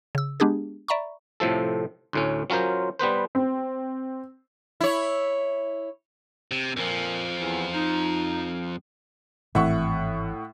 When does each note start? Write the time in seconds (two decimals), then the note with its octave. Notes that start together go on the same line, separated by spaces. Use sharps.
0.15 C#3 E6
0.40 G#3 B3 D4 G4 G#4
0.88 D5 E5 A#5 B5 C#6
1.40 A2 C3 F3 A4
2.13 D2 A2 C#4
2.50 F#3 C#4 F4 A#4 C5
2.99 G3 B3 B4 C5
3.35 C4
4.81 E4 C#5
6.51 C3
6.77 F2 A#2 F3
7.41 E2
7.74 D#4
9.55 G#1 A2 E3 C4 E5 F#5 C#6